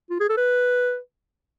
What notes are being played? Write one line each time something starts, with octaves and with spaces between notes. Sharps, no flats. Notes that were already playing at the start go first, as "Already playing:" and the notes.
F4
G#4
A4
B4